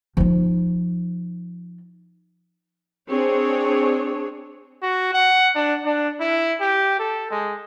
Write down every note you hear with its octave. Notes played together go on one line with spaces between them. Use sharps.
F3 D#4
C4 D4 G#4 C#5
F#4
F#5
D4
D4
E4
G4
A4
G#3